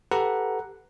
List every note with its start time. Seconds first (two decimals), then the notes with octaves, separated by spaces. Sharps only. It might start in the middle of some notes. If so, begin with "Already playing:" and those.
0.12 G4 A4 B4 F#5 A#5